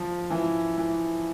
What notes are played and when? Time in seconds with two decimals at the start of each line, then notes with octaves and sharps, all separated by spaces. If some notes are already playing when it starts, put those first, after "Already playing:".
Already playing: F3
0.30 E3
0.77 E3